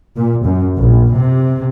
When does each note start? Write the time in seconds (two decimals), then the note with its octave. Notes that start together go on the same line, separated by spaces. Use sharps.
0.16 A#2
0.45 F#2
0.75 A#1
1.12 C3